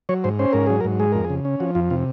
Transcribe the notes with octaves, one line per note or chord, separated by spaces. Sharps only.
F#3 C#5
G#2 C5
C#4 C5
G#2 A#4
F#3 G#4
A#4
G#2
G#3 G#4
F2 A#4
G#4
C#3
C#4
F3 F#4
F2 F4
C3 F4